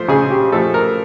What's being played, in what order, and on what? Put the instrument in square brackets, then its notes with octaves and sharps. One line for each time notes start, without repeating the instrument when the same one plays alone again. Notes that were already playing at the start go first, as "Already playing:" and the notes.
Already playing: [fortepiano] F3 A3 C5
C#3 G#4
G4
F3 A3 A4
A#4